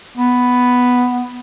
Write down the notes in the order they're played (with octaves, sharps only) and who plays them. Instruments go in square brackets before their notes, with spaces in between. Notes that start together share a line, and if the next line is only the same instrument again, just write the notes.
[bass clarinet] B3